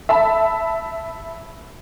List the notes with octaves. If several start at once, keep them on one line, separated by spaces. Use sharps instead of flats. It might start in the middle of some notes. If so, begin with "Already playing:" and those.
E5 A5 B5